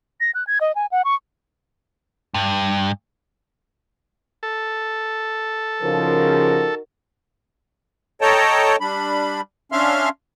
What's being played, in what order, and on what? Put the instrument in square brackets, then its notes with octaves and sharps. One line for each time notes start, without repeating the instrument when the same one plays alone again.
[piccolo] A#6
F#6
G#6
D#5
G#5
F#5
C#6
[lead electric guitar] G2
[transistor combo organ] A4
[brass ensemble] C#3 F3 [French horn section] D#4 F#4 A#4
[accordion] A4 C#5 D#5 G5 A5 A#5
G3 D4 B5
C#4 D4 E5 F5 C6 F6